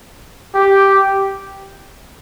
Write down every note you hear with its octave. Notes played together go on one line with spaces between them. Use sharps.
G4